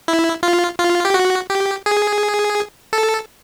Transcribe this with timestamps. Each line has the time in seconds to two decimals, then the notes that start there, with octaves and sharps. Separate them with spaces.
0.08 E4
0.43 F4
0.79 F4
1.05 G4
1.14 F#4
1.50 G4
1.86 G#4
2.93 A4